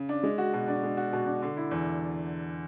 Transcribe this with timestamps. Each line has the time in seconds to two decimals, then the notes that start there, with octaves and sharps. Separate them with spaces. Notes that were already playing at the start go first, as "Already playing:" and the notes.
Already playing: C#3
0.09 D4
0.23 G#3
0.38 F#4
0.53 B2
0.68 D4
0.83 G#3
0.97 F#4
1.13 B2
1.26 D4
1.42 D3
1.57 E4
1.71 E2